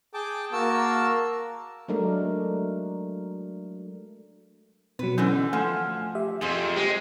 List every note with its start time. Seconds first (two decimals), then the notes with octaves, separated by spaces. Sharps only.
0.14 G#4 G5 A5 D6
0.53 A#3 F#4 A5 E6
1.88 F#3 G#3 A3 D4 A#4
4.99 B2 F#3 C4 B4
5.18 B2 D3 E3 C#4 G6
5.53 F3 A3 F#5 G#5 F6
6.15 G4 E5
6.41 F2 F3 C4 G#4
6.76 G#3 G4